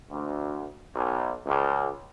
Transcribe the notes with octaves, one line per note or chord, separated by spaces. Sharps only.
D2
B1
C#2